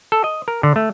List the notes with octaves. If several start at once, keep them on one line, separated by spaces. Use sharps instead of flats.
A4
D#5
A#4
D3
A3